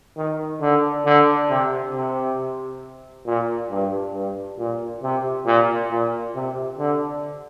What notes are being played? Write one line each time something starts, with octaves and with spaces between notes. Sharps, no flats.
D#3
D3
D3
C3
C3
A#2
G2
G2
A#2
C3
A#2
A#2
C3
D3